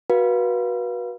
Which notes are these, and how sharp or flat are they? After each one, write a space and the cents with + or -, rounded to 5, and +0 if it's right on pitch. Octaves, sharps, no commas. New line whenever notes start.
F#4 +0 B4 -25 F5 +0